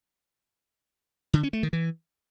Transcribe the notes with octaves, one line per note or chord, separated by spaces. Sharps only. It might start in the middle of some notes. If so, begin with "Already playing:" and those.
D3
C#4
A3
D#3
E3